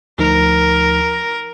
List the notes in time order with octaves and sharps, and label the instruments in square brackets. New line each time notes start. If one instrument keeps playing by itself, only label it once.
[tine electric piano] D2 F3 D#4 [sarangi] A#4